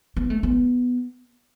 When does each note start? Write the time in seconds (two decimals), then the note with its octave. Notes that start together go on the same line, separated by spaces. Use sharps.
0.17 B3
0.30 A3
0.43 B3